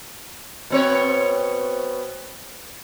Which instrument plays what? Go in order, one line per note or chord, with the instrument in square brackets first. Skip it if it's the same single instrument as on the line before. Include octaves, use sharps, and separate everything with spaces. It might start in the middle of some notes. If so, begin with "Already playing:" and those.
[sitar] B2 C4 C#5